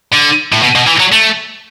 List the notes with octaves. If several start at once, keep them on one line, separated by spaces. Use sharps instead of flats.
D3
A2
B2
B2
E3
F#3
A3